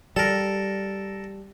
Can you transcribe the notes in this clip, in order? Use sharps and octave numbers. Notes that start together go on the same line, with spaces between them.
G3 A4 A#4